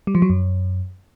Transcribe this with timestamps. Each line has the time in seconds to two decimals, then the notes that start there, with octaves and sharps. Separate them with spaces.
0.07 G3
0.15 F3
0.22 F#3
0.30 F#2